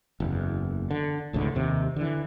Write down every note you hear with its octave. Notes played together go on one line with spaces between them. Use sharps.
F#1 E2
D3
F1 C#2 A2 D3
D#2 C3 D#3
D3 E3